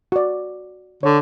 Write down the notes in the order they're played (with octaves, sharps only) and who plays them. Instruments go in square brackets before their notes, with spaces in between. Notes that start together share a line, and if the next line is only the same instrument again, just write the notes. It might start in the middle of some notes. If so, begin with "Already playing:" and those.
[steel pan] F#4 D5
[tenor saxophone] D3 [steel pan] C#5